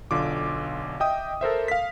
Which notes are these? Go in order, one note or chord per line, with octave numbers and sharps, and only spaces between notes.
B1 D3 F4 D6
D#5 E5 G5 D#6
A4 A#4 C5 E5
F5 B6